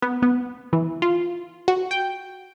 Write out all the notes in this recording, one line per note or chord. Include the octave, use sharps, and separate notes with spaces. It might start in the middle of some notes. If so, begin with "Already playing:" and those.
B3
B3
E3
F4
F#4
G5